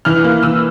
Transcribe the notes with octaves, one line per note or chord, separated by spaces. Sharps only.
E3 F6
A#3
E3 E6